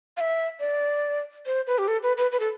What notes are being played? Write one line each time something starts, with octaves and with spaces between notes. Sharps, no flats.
F5
E5
D5
C5
B4
G4
A4
B4
B4
B4
A4